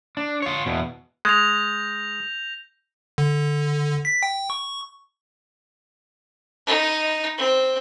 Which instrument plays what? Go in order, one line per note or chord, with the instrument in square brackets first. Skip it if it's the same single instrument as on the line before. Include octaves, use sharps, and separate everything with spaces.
[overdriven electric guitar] D4
F4 C#5
E2 B2
[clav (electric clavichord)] G#3 [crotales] G6 A#6 F7
[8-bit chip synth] D3
B6
G5
C#6
[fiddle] D#4
C4